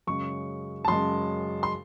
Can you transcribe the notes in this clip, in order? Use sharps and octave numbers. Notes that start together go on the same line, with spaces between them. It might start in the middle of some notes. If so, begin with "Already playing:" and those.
F#2 C#3 G#3 C#6
A5
F#2 C#3 G#3 C6
C6